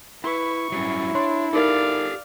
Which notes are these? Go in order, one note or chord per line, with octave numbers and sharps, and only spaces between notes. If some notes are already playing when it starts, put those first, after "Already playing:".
E4 B4 C#6
F#3 G3 C#4 E4
D4 C#5 C6
D#4 G4 A4 A#4 D5 F5